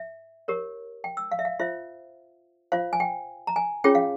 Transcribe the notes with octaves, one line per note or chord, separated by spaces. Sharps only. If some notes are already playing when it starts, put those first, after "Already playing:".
Already playing: E5
G4 A#4 C#5
G5
E6
F5
E5
F5
F4 C5 E5
F4 C5 F5
G#5
G5
A#5
G#5
C#4 F4 G#4 C#5 G5
F5